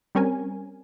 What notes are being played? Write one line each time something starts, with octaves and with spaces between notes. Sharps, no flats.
G3 C4 C#4 A#4 G#5